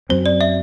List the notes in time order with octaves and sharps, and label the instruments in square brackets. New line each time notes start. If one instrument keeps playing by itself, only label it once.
[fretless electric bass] F#2 F#3 C4 [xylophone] C5
[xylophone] D5
E5